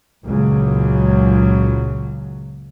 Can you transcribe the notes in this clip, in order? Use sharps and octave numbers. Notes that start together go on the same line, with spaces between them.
F#1 C#2 A#2 C#3 F#3